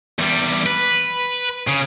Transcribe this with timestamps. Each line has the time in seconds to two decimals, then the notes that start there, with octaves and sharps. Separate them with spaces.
0.19 E2 G3
0.66 B4
1.67 C#3